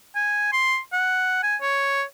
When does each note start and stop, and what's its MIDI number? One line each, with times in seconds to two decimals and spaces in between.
0.15 0.48 80
0.52 0.78 84
0.93 1.39 78
1.43 1.56 80
1.61 2.03 73